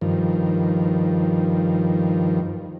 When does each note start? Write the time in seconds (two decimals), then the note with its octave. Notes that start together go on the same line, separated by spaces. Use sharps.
0.01 G2 D#3 F3